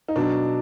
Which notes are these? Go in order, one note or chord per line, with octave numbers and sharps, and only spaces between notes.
D#4
B2 F#3 D4